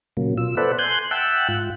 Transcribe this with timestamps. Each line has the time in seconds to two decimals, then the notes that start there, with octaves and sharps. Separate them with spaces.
0.17 A#2 C#3 F#3 A#3
0.37 B2 F4 E6
0.57 A4 B4 C5 D5 E5 F#5
0.79 G#5 C6 F#6 G6
1.11 E5 F#5 G5 A5 E6 F#6
1.48 G#2 F4